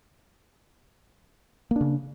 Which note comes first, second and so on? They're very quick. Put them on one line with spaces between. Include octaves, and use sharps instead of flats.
A#3 D4 C#3